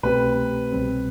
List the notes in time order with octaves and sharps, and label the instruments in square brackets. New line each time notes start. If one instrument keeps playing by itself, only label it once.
[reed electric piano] C2 B2 A3 C4 G4 [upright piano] B4
[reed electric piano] C2 B2 G3 C4